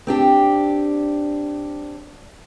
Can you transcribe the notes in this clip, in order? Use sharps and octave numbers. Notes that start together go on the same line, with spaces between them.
C4 D4 G4